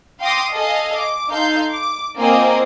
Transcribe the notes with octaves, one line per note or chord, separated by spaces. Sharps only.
F5 G5 C6 D6 D#6 A#6
A4 D#5 F5 G#5
D6
D#4 A4 F5 C6 G6
D6
A#3 C4 F4 D#5 G#5